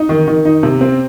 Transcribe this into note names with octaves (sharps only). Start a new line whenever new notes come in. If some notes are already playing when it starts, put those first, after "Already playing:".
Already playing: D#4
D#3
D#3
D#4
C3
C4